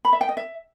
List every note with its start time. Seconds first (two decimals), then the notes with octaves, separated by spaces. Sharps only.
0.05 B5
0.13 E5
0.21 G5
0.29 D#5
0.37 E5